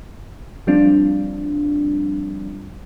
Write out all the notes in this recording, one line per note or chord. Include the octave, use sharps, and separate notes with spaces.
F3 G3 C4 D4 F4